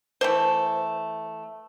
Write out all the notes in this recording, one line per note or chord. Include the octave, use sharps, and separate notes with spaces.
E3 A3 C5